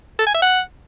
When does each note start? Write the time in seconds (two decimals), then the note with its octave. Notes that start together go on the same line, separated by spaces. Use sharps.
0.19 A4
0.27 G#5
0.34 E5
0.42 F#5